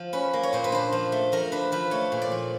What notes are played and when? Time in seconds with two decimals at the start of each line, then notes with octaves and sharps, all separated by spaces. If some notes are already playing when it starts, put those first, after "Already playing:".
Already playing: F3
0.13 C#4 B4
0.33 A#3
0.43 C#5
0.53 A#2 C5
0.64 B4
0.72 D4 C5
0.92 F3
1.12 A3
1.32 F3 A#4
1.52 D4 B4
1.72 F3 B4
1.91 A3 C#5
2.12 A#2
2.22 D5
2.32 F3